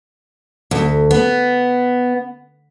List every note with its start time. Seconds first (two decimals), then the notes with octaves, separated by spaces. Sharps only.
0.71 D2
1.11 B3